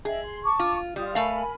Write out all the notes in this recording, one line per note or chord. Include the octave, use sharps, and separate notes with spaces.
G#4 D#5 E5 G5
C6
A5 C#6 D6
F4
G3 F4 D#6
A3 A#4 F5 G#5 B5